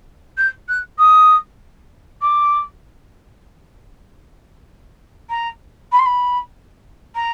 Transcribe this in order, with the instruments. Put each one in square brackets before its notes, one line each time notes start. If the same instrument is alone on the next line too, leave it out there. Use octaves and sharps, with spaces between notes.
[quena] G6
F#6
D#6
D6
A#5
B5
C6
B5
A#5